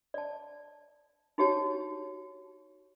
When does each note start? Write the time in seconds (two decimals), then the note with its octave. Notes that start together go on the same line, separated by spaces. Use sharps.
0.14 D5 A5
1.38 D#4 F#4 G4 C#5 A5